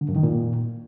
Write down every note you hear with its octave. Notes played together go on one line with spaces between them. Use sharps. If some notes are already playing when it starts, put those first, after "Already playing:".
D3
F#2
D#3
A#2